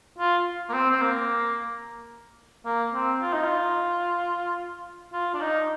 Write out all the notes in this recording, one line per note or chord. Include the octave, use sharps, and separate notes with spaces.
F4
A#3
C4
C4
A#3
A#3
C4
F4
D#4
F4
F4
D4
D#4